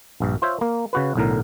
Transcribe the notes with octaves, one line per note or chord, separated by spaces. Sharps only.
A#1 G2
F4 C5 C#5 E5
A#3
C#3 F#4 B4
B1 A2 D3 A#4